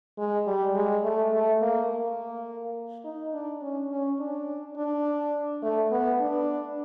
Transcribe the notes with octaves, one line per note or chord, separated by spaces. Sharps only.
G#3
G3
G#3
A3
A3
A#3
A#3
D#4
D4
C#4
C#4
D4
D4
A3
B3
D4